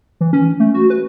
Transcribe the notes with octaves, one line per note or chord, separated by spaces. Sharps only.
E3
C#4
A3
F#4
B4